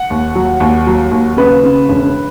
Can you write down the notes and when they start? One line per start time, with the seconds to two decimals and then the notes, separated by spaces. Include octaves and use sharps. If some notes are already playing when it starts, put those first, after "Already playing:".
Already playing: F#5
0.10 D#2
0.35 F#3
0.60 D#2
0.87 F#3
1.11 D#2
1.37 C#3 B4
1.64 C#3
1.89 E1